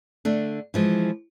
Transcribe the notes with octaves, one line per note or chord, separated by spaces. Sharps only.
D3 A3 D4
E3 F3 G#3